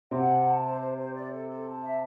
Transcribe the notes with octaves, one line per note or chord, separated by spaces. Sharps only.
C3 C4 F#5
A5
A5
C5
C5
C5
D5
A4
A4
A5
E5